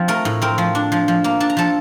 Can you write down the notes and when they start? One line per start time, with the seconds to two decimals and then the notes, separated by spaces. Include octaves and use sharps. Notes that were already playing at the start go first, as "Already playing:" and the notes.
Already playing: F3 C4
0.08 A3 A#4 A#5
0.25 A2
0.42 C4 A#4 A#5
0.58 F3
0.75 D4
0.92 F3
1.08 F3
1.24 A#3
1.40 D4 A5
1.50 A#5
1.57 F3 A4 A5